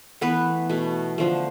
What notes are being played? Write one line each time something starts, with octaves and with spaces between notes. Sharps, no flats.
E3 A3 B3 B4
B2 A3
D3 F3 A3